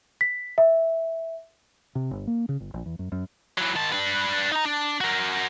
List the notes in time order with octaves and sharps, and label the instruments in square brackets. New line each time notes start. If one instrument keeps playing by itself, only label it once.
[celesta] B6
E5
[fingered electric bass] C3
G1
A#3
C#3
G1
A#1
E2
F#2
F#2
[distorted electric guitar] E3 F#3
D#3 A5
D4 B4
D#4 A#5
D4
F#4 A#4